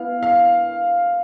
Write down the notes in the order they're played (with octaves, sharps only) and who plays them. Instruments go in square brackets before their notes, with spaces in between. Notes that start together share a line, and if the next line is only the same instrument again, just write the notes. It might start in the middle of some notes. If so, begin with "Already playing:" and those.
Already playing: [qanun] B3 E4 [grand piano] F5
[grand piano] F5